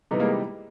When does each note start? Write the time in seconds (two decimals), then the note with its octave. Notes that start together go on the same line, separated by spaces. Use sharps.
0.11 C3 E3 G3 B3 D#4
0.20 G#3 A#3